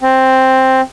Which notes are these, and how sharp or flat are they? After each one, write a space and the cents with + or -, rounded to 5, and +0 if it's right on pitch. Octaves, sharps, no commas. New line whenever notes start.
C4 +5